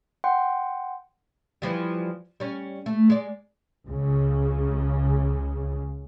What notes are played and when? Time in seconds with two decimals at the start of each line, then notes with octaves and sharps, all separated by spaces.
0.24 F#5 G5 C6
1.62 E3 F3 G3
2.40 G3 C#4
2.86 A3
3.10 G#3 D5
3.87 C#2 C#3